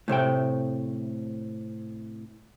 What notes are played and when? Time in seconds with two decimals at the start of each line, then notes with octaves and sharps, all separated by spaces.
0.08 A2 C3 A3 G5